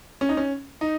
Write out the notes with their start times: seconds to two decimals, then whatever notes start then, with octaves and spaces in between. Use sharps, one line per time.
0.21 C#4
0.29 D#4
0.37 C#4
0.81 D#4